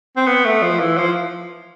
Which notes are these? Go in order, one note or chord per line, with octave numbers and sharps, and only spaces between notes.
C4
B3
A3
F3
E3
F3